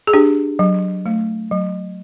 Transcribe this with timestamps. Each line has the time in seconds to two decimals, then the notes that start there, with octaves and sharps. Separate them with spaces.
0.07 G#4
0.13 D4 G4
0.59 F#3
1.06 A3
1.51 F#3